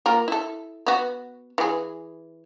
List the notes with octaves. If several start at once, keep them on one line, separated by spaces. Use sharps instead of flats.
A#3 F4 A#4
E4 A4
B3 F#4
E3 G#4